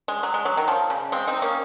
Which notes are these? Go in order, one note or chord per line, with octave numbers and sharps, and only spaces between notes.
G#3
F#3
G#3
F#3
D#3
F3
C#3
G#3 C4
C4 D#4
A#3 C#4